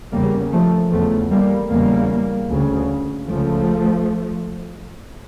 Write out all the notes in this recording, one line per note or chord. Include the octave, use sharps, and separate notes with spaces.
E2 C#3 G3 A#3
F3 A3
E2 C#3 F3 A3
G3 A#3
E2 C#3 G3 A#3
D2 C#3
C#2 C#3 F3 A3